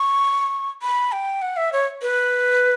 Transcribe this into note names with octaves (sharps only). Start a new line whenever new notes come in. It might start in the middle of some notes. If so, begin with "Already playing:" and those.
Already playing: C#6
B5
G5
F#5
E5
C#5
B4